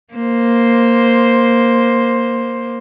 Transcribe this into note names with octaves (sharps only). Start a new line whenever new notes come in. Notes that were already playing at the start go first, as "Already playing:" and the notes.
A#3 C5